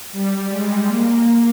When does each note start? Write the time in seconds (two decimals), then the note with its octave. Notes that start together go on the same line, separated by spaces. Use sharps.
0.12 G3
0.49 G#3
0.86 A#3